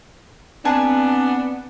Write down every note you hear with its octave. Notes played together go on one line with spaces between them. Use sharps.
B3 C4 D4 G#4 A5 A#5